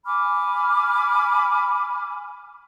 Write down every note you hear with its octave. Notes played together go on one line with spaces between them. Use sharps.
G#5 B5 D6 F6